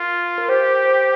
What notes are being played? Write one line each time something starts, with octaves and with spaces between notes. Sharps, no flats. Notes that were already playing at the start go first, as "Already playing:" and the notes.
Already playing: F4 A#4
A#4
G4 C5
C5